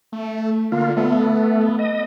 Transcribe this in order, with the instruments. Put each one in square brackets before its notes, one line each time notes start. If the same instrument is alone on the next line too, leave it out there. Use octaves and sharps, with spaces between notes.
[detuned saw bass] A3
[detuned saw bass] D3 [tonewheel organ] A#3 F4
[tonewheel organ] A3 [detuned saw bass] B3
[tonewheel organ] D#5